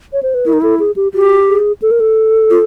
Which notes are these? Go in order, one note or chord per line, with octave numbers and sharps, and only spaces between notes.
C#5
C5
B4
E4 A#4
D#4
E4 A4
G#4
G4
F#4 G4
G#4
A4
A#4
A4
F4